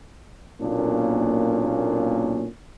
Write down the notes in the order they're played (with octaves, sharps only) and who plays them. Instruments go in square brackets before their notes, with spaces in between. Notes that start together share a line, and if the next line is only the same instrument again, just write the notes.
[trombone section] B1 A#2 A#3 C#4 D4